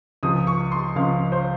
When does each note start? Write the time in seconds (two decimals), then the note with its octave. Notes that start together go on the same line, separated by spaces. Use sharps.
0.23 C#2 C#3 F3 D#6
0.47 C#6
0.72 C6
0.96 C#2 C#3 F3 F5
1.32 C5